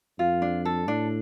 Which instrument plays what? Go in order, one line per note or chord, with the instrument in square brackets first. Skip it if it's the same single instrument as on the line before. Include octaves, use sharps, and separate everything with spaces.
[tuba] F2 [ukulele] F4
[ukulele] D4
A4
[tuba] A2 [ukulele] D4